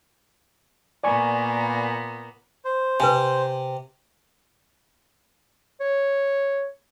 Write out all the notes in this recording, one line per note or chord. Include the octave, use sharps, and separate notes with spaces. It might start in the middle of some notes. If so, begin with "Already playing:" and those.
A#2 A#3 B3 D5 G#5 C#6
C5
C3 B4 G#5
C#5